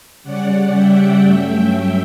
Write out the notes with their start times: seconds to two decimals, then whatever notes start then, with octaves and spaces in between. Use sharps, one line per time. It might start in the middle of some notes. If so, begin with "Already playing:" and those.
0.23 C#3 G3 C#4 D5 F#5
0.73 E5 G5
1.23 G2 F#3 A3 C#4